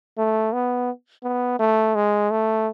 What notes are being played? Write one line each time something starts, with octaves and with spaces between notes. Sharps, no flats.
A3
B3
B3
A3
G#3
A3